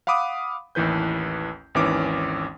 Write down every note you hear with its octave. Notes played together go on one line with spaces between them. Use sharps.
F5 F#5 B5 D6 D#6
A1 D#2 E3 B4 G6
G#1 D#2 E3 C#4 D6